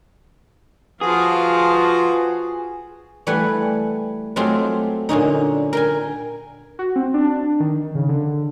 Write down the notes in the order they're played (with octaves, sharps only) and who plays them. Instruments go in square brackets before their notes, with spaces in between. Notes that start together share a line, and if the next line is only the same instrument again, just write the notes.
[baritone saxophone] F3 [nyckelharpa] F4 [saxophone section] F#4 B4 [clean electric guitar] G#4
[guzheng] E3 G3 A3 B4 F#5 G#5
F#3 G#3 A3 C4 F4 G4
A#2 D3 C#4 D#4
A#4 G5 G#5
[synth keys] F#4
C4
D4
D#3
C#3
D3